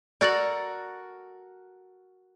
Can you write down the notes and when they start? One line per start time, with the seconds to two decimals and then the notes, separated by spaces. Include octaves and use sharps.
0.21 F#4 A4 A#4 D5 A6 F#7